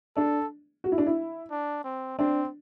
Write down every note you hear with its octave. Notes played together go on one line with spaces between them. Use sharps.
D4 A4
F#4
E4
D4
E4
D4
C4
C4 D4